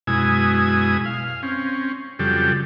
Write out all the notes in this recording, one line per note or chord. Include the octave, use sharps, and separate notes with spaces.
F#2 B2 G#3 E4 G#5 D#6
F5
C4 C#4
F2 C#3 F#3 G3 G4 A4